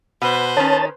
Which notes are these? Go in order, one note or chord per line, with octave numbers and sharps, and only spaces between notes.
B2 B4 C5
D#3 C#4 C#5 A5 A6